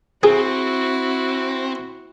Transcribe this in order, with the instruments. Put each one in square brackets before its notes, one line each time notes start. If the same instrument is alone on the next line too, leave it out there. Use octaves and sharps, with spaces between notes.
[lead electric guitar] C4 [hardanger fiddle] E4 F#4 [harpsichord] G#4